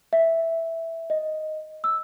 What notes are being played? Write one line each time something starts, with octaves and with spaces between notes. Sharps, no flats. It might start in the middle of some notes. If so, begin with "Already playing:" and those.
E5
D#5
E6